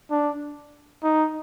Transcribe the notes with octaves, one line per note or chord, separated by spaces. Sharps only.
D4
D#4